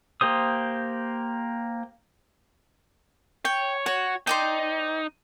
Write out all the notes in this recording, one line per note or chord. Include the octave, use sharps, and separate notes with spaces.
A#3 G4 C5 D#6
C#5 G5
F#4 C#5
D#4 C5 D5 G5